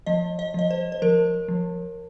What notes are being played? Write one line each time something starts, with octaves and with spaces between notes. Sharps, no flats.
F3 D#5
D#5
F3 D#5
C5
C5
F3 A#4
F3